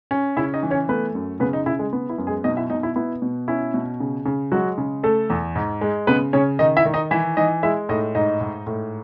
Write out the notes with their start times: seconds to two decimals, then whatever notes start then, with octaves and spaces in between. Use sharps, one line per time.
0.11 C#4
0.37 C#3 E4 E5
0.54 D#4 D#5
0.63 E3
0.71 C#4 C#5
0.89 A3 B3 B4
1.15 F#2
1.40 C#3 B3 B4
1.53 D#4
1.66 C#3 E4
1.79 G#3 G#4
1.93 B3
2.09 E4
2.18 F#2
2.27 G#3 G#4
2.44 B2 D#4 D#5
2.57 E4 E5
2.70 B2 D#4 D#5
2.83 E4
2.96 B3 E4
3.22 B2
3.48 C#4 E4
3.74 B2
4.00 C#3
4.25 C#3
4.52 F#3 G#3 F#4
4.78 C#3
5.03 A3 A4
5.30 E2
5.55 G#2
5.81 G#3
6.07 C#3 B3 B4
6.33 C#3 C#4 C#5
6.59 D#3 D#4 D#5
6.77 E4 E5
6.85 D#3
6.94 D#4 D#5
7.11 E3 E4 E5
7.37 E3 D#4 D#5
7.63 G#3 E4 E5
7.89 A2 D#4 D#5
8.15 G#2 D#4 D#5
8.41 G#2
8.67 A2